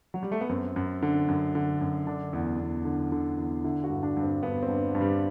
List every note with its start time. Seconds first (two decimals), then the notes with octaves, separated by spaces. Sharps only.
0.14 F#3
0.23 G3
0.32 A3
0.41 B3
0.49 F#2 C4
0.76 F#2
1.03 D3
1.28 F#2
1.55 D3
1.81 F#2
2.07 D3 D4
2.33 E2
2.60 E2
2.85 D3
3.12 D3
3.37 E2
3.64 D3 E4
3.84 F#4
3.90 G2
4.03 D4
4.17 G2
4.23 C4
4.43 G2 B3
4.63 C4
4.68 G2
4.95 G2
5.01 G3